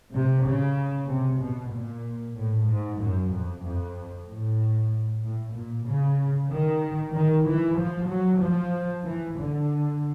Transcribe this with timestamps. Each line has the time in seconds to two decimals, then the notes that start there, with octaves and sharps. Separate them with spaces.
0.14 C3
0.46 C#3
1.09 C3
1.41 B2
1.72 A#2
2.37 A2
2.68 G#2
3.00 F#2
3.32 F2
3.64 F2
4.27 A2
5.23 A2
5.55 A#2
5.86 C#3
6.50 D#3
7.14 D#3
7.46 E3
7.77 F3
8.09 F#3
8.41 F3
9.04 E3
9.37 D3